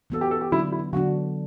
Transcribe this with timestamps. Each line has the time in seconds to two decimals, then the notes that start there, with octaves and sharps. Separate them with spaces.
0.10 E3 B3 F#4 A4
0.21 G4
0.31 A4
0.41 G4
0.52 D3 F#3 B3 D4 E4
0.72 E4
0.93 D3 F#3 B3 D4 F#4